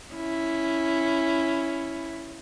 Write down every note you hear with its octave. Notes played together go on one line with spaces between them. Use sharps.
C#4 E4